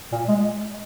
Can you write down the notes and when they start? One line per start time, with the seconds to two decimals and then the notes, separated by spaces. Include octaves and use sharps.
0.12 A#2
0.28 G#3